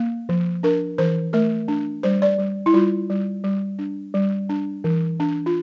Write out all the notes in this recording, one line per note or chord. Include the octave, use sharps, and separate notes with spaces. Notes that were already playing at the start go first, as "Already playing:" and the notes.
Already playing: A#3
F3
D4 A#4
E3 C5
A3 A#4
D4
G3 C5
D5
G3
E4
G3 F4
G3
G3
D4
G3
D4
E3
D4
F4